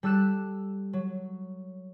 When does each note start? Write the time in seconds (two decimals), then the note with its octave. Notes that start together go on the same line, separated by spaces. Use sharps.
0.03 G3 A4 E6 F#6 E7
0.93 F#3